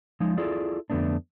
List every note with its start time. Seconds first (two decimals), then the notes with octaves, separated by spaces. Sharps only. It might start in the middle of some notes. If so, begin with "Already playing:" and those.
0.20 F3 G#3 D#4
0.37 E4 F4 G#4 A4 D5
0.90 F2 D3 A3 B3 D4